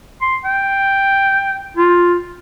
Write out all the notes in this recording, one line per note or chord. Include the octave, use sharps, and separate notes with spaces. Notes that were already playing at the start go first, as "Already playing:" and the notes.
C6
G5
F4